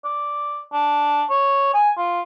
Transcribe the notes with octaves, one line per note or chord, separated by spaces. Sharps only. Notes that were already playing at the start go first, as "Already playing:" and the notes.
D5
D4
C#5
G#5
F4